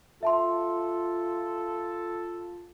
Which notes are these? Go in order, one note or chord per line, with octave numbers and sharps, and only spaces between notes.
F4 A4 E5 A5 C6